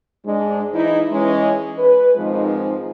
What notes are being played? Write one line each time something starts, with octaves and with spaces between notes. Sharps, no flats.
G#2 G#3 D4
E3 D#4 E4
E3 G#3 C#4
B4
G#2 D#3 F3 G#3 C4 D#4